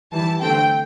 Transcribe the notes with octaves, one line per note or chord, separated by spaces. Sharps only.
E3 G3 E4 A5
D3 A3 C4 G5